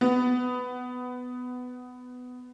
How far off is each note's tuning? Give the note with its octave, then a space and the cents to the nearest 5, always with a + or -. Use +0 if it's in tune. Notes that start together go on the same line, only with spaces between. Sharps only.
B3 +15